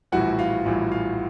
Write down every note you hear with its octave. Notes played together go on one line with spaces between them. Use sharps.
A#1 A2 E3 G3 F#4 F#5
F4 F5
A#1 A2 E3 G3
F4 F5